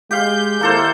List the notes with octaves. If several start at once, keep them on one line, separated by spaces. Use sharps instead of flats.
G#3 G4 F5 G6
D#3 A#3 E4 A4 C5